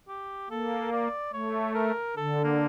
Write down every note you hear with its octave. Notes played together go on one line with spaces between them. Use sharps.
G4
A#3 A4
D5
A3 C#5
A#4
D3 A4
A#3